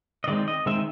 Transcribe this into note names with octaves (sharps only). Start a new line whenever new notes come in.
D#5
D#3 G#3 C4 D5
D#5
D#3 G#3 C4 E5